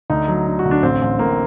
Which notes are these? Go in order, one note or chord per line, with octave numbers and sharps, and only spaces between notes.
D2 D#4
F#3
D3
F#4
D2
D4
A1 C4
A1
A2 A#3